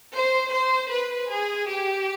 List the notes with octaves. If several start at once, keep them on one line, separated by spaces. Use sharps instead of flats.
C5
C5
B4
G#4
G4